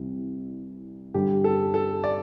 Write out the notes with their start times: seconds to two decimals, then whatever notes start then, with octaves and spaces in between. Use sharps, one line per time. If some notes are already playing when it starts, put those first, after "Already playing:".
Already playing: C2 C3 E3 G3
1.14 G2 D3 G3 G4
1.44 A4
1.74 A4
2.04 D5